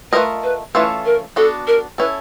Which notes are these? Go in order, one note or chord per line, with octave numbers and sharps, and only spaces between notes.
A3 D4 F4 A#4 B4 D#5
B4
E3 A3 C#4 F4 A4 B4
A#4
B3 D4 F#4 A4
A#4
C#4 E4 A4 B4